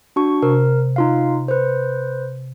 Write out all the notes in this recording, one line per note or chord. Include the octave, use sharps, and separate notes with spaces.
D4 F#4 C#6
C3 A#4
D#4 F4 F5
B4 C5